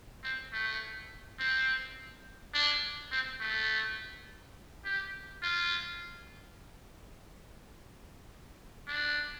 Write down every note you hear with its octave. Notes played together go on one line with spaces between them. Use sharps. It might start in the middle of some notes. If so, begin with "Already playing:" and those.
C4
A3
C4
D4
C4
A3
G4
F4
D4